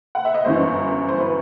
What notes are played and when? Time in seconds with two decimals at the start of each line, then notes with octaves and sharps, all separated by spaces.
0.15 F#5
0.25 E5
0.34 D#5
0.45 G1 F#2 E3 C5
1.08 C5
1.20 B4